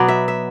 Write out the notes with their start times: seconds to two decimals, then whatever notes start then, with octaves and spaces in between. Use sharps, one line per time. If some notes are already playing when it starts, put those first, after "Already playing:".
Already playing: B2 F#3 B3 D5
0.08 E5
0.28 E5